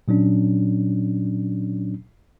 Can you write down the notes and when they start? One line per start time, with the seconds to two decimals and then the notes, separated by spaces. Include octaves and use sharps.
0.08 A#2 F#3 C#4 D4